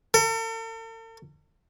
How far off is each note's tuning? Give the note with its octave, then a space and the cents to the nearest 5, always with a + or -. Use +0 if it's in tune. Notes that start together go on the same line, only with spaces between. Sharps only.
A4 +45